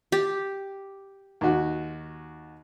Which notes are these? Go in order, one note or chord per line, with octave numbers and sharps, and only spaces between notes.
G4
D#2 F#4